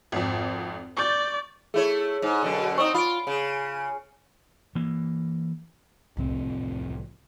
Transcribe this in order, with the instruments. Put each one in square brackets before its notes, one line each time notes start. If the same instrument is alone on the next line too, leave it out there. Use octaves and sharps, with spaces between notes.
[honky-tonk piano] G#1 F2
[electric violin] D5 [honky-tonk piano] C#6 G6 A6
[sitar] A3 E4 C#5 [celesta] G#4
[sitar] G#2
F#2 B2 D3
[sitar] C4 D4 D#4 [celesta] C#6 D#6
[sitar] F4 [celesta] B5 D7
[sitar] C#3
[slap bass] E3 A#3
[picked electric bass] D#1 F2 C4 [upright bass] C2 A2